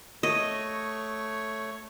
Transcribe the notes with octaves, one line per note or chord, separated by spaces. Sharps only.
A3 C#5 D#5